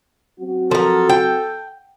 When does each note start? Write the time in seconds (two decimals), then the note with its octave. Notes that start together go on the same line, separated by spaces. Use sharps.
0.38 F#3 C4 F#4
0.71 F3 A4 A#4
1.09 G5